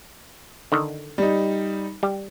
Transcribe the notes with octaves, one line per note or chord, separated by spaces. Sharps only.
D3 D#3
G3 D#4
G3